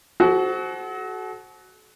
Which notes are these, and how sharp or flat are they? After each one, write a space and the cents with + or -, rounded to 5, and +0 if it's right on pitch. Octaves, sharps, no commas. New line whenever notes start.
F#4 +10 A4 -45 C5 +0